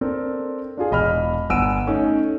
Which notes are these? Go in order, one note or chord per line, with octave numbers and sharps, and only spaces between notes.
C4 D4 A4 A#4
D4 F4 G#4
E1 D#5 B5 F6
G1 F#5 G#5 E6 D7 D#7
A3 C#4 D#4